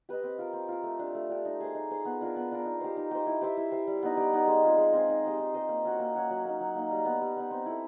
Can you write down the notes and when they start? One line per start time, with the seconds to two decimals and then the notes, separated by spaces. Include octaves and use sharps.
0.09 G4 B4 D#5
0.23 C4
0.38 F4 A#4
0.53 C4
0.69 F4 A#4
0.83 A3
0.99 D4 G4
1.15 A3
1.29 D4 G4
1.45 D#4
1.60 G#4 C5
1.75 D#4
1.91 G#4 C5
2.05 B3
2.21 D4 F4 A#4
2.36 B3
2.51 D4 F4 A#4
2.65 D#4
2.81 G4 C5
2.97 D#4
3.11 G4 C5
3.27 E4
3.41 G4 C5 E5
3.57 E4
3.72 G4 C5 E5
3.87 G3
4.03 B3 D#4
4.17 G3
4.33 B3 D#4
4.47 G#3
4.63 C4 F4 G#4
4.78 G#3
4.93 C4 F4 G#4
5.09 D#4
5.24 G4 C5 D#5
5.40 D#4
5.54 G4 C5 D#5
5.69 A#3
5.85 C#4 F#4
6.00 A#3
6.15 C#4 F#4
6.30 F#3
6.45 A#3 D#4
6.61 F#3
6.75 A#3 D#4
6.91 G3
7.05 B3 D#4
7.22 G3
7.36 B3 D#4
7.51 C4
7.66 E4 A4